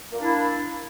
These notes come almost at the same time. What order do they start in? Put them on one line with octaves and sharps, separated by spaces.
A#3 D4 E4